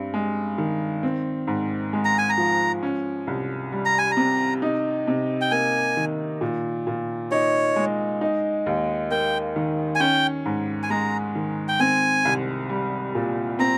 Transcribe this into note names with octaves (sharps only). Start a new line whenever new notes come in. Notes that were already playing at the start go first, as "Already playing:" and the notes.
Already playing: G2 C4
G#3
D#3
C4
G#2
G#3
A#5
G#5
A#5
F3
C#4
C2
G3
A#5
G#5
A#5
C3
D#4
C3
G5
A#3 G#5
D#3
A#2
A#2
D#4 C#5
G#3
D#4
D#2
A#3 G5
D#3
G#5
C#4 G5
G#2
G#5
G#3 A#5
D#3
G5
C4 G#5
C2
G3
A#2
C4 A#5